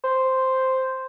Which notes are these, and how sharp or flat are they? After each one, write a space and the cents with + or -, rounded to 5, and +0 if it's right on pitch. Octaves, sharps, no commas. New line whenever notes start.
C5 -5